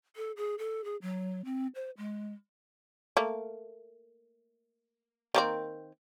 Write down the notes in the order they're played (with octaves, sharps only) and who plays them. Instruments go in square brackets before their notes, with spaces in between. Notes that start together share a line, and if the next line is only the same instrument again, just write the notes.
[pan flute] A4
G#4
A4
G#4
F#3
C4
C5
G#3
[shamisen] A3 A#3
D#3 A#3 C4